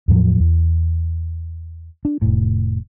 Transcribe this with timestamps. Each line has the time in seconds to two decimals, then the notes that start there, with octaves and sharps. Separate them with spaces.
0.08 E2 A2 F3 F#3
0.40 E2
2.05 D4
2.22 F1 A2